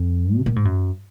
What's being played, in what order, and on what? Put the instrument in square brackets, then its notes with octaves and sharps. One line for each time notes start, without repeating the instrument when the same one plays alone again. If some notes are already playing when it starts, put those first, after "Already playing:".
Already playing: [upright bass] F2
C3
A#2
G#2
F#2